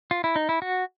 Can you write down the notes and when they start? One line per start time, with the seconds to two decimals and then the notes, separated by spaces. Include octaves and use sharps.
0.11 F4
0.24 E4
0.36 D#4
0.49 E4
0.62 F#4